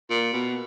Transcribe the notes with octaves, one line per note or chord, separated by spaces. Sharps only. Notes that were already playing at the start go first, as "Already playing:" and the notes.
A#2
B2